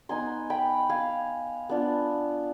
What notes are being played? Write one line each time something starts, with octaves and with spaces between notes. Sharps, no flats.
B3 D#4 G#5 C6
G5 B5
F5 G#5
B3 D4 F4